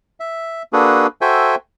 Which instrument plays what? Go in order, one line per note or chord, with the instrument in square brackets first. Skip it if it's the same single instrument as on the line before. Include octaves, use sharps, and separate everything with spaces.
[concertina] E5
A#3 D4 F#4 G#4 A4 B4
F#4 A4 C5 E5 G5 G#5